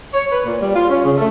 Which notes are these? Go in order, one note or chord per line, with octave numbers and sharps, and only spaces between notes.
C#5
B4
A#2
G3
F4
C#4
C#3
A3